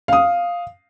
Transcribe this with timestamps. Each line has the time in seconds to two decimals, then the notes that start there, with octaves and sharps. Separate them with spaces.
0.08 F5 D#6